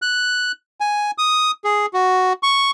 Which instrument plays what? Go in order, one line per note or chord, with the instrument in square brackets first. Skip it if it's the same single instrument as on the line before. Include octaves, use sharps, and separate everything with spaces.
[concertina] F#6
G#5
D#6
G#4
F#4
C#6